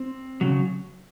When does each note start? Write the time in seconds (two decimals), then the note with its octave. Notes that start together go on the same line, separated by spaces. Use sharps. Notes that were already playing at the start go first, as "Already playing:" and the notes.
Already playing: C4
0.41 C#3 F#3